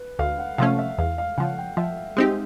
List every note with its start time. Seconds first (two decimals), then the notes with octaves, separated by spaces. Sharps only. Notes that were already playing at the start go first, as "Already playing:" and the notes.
Already playing: B4
0.19 D2 F5
0.39 F#5
0.58 C3 F3 A3 C#4 F5
0.79 E5
0.98 E2 F5
1.18 F5
1.38 C#3 F3 F#5
1.58 G5
1.77 F3 E5
2.17 G#3 C4 D#4 G4